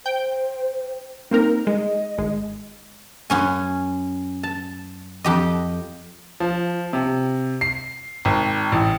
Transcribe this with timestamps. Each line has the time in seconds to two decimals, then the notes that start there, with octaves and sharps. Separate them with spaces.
0.06 C5 G5
1.31 A#3 C4 D#4 A#4
1.67 G#3 D#5
2.18 G#1 G#3
3.30 F#2 C#4 G#5
4.43 A5
5.24 F2 G4 D#5
6.40 F3
6.93 C3
7.61 C7
8.25 G#1
8.72 A1